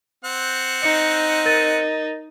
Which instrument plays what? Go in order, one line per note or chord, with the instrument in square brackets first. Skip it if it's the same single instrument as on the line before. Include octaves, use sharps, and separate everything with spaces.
[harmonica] C4 F#5
[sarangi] D#4 [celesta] C#7
[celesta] A#4 A6 D#7